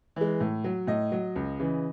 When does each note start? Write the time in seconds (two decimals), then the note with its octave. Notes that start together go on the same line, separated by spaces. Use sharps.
0.16 E3 G#3
0.40 A2
0.64 F#3
0.87 A2 D#5
1.12 F#3
1.36 C#2
1.60 C#3 E3